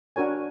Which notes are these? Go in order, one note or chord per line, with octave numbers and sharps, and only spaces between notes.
D4 F#4 A#4 C#5 G#5